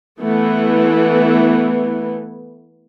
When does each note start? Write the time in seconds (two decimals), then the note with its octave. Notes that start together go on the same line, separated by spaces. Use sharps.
0.20 E3 A3 B3